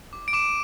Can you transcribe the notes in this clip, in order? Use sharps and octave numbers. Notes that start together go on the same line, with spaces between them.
D6
D7
D6 E7